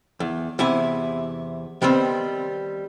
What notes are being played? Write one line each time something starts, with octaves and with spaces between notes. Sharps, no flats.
E2
E2 C3 E4 G#5
D#3 G3 B3 C4